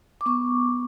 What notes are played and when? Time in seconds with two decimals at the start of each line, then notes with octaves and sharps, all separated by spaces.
0.21 D6
0.26 B3 C#6